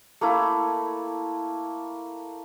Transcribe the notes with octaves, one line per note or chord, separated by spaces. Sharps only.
A3 A#3 E4